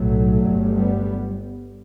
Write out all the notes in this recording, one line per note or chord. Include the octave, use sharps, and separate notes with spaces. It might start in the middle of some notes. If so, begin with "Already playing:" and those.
Already playing: B1 A2 F#3 A3
G1 G2
G3 B3